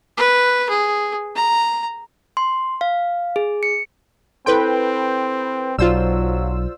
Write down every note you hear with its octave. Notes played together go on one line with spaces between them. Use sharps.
B4
G#4
A#5
C6
F5
G#4
C#7
C4 E4 A4 B4 G5 C6
B1 F#3 F4 C5 D5 E6